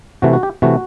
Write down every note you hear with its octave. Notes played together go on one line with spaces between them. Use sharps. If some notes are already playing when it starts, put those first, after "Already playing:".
C3 E3 A3 F#4
F#4
G4
C3 E3 A3 F#4